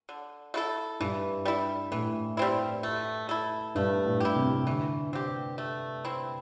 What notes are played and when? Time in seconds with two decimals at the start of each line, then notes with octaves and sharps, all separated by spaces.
0.09 D3
0.54 A3 E4 A4
1.00 G2 E3
1.45 G3 E4
1.92 A2 E3
2.37 G3 C4 E4
2.83 A3
3.29 E4 A4
3.75 G2 A3
4.06 A2
4.20 E4 G4
4.36 C3
4.67 D3 E3
5.13 C4 G4
5.58 A3
6.05 C4 E4